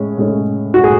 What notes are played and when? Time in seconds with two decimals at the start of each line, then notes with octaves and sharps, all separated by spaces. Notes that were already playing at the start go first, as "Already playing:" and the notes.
Already playing: A2 G#3 C#4
0.18 A2 G#3 C#4
0.74 F#4
0.84 A2 G#4